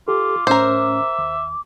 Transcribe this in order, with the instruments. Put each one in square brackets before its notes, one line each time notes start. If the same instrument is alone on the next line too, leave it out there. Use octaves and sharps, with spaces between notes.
[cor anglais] F4 [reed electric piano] G4 A4 [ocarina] D6
[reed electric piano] A2 C#4 [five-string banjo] A#4 C5 [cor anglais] E5
[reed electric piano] D#2